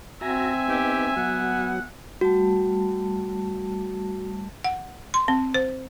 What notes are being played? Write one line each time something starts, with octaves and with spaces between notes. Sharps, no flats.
C4 F#4 E5 G#5 A#5
B3 D#4 G4
F#3 B3 F#5
G3 A3 F#4 A5
F#5
C6
C4
C5